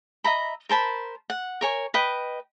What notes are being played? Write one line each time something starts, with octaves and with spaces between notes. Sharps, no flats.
D#5 E5 A#5 B5
A#4 C5 A5 B5
F#5
A#4 C#5 G#5
B4 D#5 G5